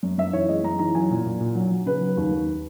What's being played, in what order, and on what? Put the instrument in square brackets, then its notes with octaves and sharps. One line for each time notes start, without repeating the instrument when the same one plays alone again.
[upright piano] F#2
F#2 E5
E3 C#5
G#3 D#5
F#2 A#5
E3 A#5
F#3 G#5
A#2
A#2
A#2
F#3
F#3
C#3 B4
F#3
D#2
D#2